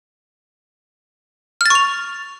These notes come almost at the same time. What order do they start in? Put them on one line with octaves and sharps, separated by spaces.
F6 A6 C#6 F7